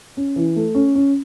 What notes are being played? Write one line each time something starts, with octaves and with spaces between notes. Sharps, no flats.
C#4
E3
A3
C#4
C#4